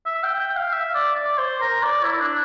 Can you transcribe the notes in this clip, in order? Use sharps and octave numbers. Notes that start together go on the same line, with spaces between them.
E5
G5
G5
F5
E5
D5
D5
C5
A#4
D5
E4
D4